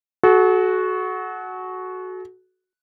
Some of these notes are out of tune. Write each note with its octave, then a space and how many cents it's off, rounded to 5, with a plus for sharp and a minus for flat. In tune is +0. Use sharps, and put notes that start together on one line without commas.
F#4 +0 A4 -45